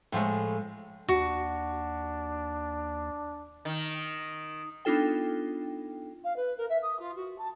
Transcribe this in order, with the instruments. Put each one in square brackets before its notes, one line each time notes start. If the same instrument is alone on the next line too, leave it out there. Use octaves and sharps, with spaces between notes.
[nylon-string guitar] A2 F3 G#3 A3
[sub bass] D#2 [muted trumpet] D4 [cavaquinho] F#4
[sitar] D#3
[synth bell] B3 D4 D#4 F4 A4 G5
[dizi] F5
B4
A#4
E5
D#6
F4
F#4
A5